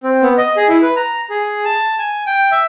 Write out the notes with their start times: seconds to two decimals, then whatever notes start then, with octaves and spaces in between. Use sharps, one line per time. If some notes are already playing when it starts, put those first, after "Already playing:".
0.04 C4
0.22 B3
0.38 D#5
0.57 G#4
0.69 E4
0.82 B4
0.97 A#5
1.30 G#4
1.65 A5
1.99 G#5
2.27 G5
2.51 E5